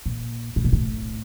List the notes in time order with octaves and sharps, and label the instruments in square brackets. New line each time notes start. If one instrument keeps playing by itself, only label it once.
[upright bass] A#2
A2
A#2
A2